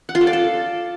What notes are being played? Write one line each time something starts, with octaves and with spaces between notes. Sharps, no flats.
F#5
F4
A4
D5
A4